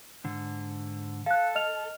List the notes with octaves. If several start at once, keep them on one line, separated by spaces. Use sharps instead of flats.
G#2 D3
A4 F5 F#6
D#5 F6 F7